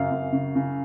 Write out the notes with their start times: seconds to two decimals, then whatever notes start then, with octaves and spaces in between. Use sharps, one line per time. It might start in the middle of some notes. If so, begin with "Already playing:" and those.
Already playing: F#2 C#3 F5
0.11 F#2
0.32 C#3
0.55 C#3